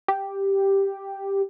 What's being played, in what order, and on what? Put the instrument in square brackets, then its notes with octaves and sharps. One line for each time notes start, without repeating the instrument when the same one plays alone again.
[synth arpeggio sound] G4